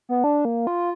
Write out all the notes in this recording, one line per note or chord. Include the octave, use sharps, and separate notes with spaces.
B3
D4
A#3
F4